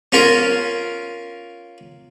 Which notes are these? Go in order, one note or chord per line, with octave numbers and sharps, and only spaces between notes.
C#4 F4 A#4